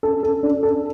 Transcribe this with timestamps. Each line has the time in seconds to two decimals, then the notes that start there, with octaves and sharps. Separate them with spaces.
0.03 A4
0.23 A4
0.43 D4
0.63 A4